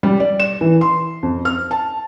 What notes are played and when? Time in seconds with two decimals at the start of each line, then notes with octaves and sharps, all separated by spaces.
0.03 G3
0.20 D5
0.40 E7
0.61 E3
0.81 C6
1.23 F2
1.45 F6
1.71 A5